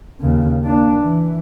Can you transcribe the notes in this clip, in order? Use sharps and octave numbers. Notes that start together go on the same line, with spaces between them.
D#2 C#3
A#3 D4
E3